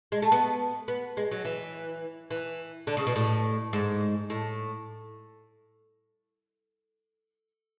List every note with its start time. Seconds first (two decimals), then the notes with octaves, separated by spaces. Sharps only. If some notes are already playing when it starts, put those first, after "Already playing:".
0.12 G#3
0.22 A3
0.32 B3
0.88 B3
1.17 G#3
1.31 F#3
1.45 E3
2.30 E3
2.87 D3
2.97 C#3
3.07 B2
3.16 A2
3.73 G#2
4.30 A2